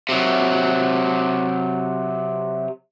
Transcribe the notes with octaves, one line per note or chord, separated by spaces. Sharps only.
C3 F#3